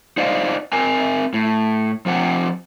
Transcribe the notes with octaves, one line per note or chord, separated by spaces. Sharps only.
D#4 C5 D5 D#5 F5
C4 A#4 G#5
A2
F3 C4 F#5 G5